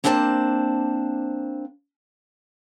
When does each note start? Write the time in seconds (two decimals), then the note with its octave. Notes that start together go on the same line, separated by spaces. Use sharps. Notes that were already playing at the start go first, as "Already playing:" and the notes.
0.04 A#3 C4 D4 C5 A5